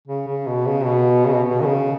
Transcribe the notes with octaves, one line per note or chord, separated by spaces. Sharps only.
C#3
C#3
B2
C#3
B2
C#3
B2
B2
D#3
C#3